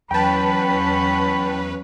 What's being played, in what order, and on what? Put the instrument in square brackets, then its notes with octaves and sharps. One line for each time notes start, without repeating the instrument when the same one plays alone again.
[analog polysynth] E2 B4 [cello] F#3 C#4 [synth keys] G5 A5 [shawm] B5